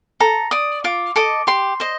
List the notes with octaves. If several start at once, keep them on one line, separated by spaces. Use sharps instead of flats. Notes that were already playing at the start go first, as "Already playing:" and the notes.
A4 A#5
D5 D#6
F4 D6
A4 D#5 D6
G4 C6
C5 D#5